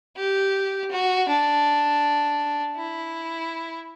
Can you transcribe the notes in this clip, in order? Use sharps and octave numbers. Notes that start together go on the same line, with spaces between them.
G4
F#4
D4
E4